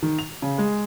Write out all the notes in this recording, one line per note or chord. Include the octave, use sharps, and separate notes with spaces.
D#3
F7
C#3
G#3